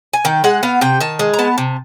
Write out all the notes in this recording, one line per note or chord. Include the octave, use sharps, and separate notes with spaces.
G#5
D#3 G5
G#3 F#5
B3 F5
C3 G5
D#3 A5
G#3
A#5
B3 A5
C3